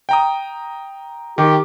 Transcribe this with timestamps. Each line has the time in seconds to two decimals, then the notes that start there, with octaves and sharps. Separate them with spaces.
0.09 G5 A#5 D#6
1.38 D#3 G4